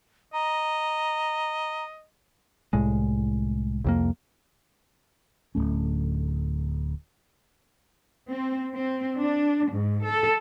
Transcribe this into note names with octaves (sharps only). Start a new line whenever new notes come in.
D#5 A#5
C2 A2 G#3
C2 F2 A#3
D1 G#1 A3 C#4
C4
C4
D4
G#2
A4